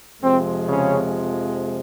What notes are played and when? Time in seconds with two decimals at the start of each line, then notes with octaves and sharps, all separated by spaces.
0.22 F2 C3 F3 G#3 C4
0.68 C#3 C#4